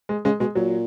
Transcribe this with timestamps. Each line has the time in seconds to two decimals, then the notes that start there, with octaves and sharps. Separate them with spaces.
0.09 G#3
0.25 C#3 G#3
0.40 B2 G#3
0.55 A#2 F#3